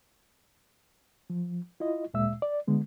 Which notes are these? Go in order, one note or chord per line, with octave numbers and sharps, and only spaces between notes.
F3
E4 F4 D#5
D2 A#2 G#3 E5 E6
D5
D3 G#3 B3